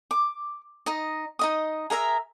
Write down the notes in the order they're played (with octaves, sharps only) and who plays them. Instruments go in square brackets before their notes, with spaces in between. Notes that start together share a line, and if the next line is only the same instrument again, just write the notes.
[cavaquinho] D6
D#4 D#5
D#4 D#5 D#6
G#4 A#4 E5 A#5